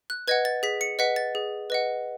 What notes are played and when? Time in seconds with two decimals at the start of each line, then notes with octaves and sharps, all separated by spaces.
0.10 F#6
0.28 B4 D#5 F#5 G#6
0.45 A6
0.63 G#4 B6
0.81 C#7
0.99 B4 D#5 F#5 B6
1.16 A6
1.35 G#4
1.70 B4 D#5 F#5